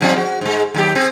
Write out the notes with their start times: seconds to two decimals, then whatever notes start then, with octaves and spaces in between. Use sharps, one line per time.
0.01 G#2 F3 C4
0.18 F#4
0.41 G#2 G#3
0.74 D#2 F#3 G4
0.95 C4 G#4